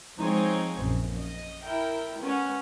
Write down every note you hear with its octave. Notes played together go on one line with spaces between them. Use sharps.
F3 G#3 C4 D#4 G#4 C#5
A#1 F#2
D#5
E4 A#4 G5
B3 C#4 F#5